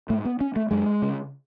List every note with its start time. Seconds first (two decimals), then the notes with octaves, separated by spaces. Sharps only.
0.10 G#2 A3
0.25 B3
0.41 C#4
0.56 A3
0.71 F#2 G#3
1.02 C#3